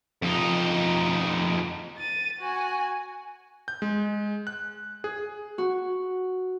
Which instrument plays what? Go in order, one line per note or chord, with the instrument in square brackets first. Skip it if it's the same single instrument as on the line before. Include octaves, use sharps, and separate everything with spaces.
[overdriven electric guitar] F2 D#4
[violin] A6 D#7
F#4 G#5
[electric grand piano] G6
G#3
F#6
G#4
[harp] F#4